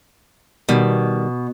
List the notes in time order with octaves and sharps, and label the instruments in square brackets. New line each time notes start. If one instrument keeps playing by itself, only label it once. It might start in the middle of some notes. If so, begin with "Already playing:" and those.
[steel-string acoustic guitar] B2 [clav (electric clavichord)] D#3 G3